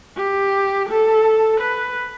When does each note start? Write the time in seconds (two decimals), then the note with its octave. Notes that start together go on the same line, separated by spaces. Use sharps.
0.17 G4
0.89 A4
1.61 B4